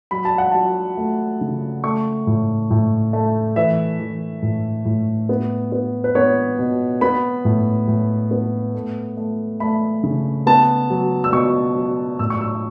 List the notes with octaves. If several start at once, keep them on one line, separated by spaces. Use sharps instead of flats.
F#3 B5
A5
F#5
F#3 A5
A3
C#3
A3 C#6
A2
A2
A3
E3 E5
E3
A2
A2
B3
B3
B4
B3 C#5
B2
B3 B5
A2
A2
B3
A3
A3
A3 B5
C#3
B3 A5
F#3
E6
B2 C#6
F#3
A2 E6
C#6
E6